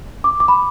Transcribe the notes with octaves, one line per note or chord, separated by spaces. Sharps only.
D6
D6
B5